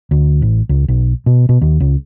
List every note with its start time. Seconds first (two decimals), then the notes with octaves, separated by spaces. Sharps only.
0.11 D2
0.42 A1
0.69 C#2
0.88 B1
1.26 B2
1.49 B2
1.62 D#2
1.80 C#2